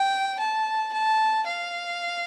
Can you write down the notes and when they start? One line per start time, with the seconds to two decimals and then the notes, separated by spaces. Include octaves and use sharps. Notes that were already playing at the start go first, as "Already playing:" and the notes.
Already playing: G5
0.40 A5
0.93 A5
1.47 F5